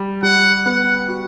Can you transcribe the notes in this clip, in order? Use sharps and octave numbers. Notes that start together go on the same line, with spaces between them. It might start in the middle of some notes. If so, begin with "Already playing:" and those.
Already playing: G3
G3 F#5
B3 F#5
F#4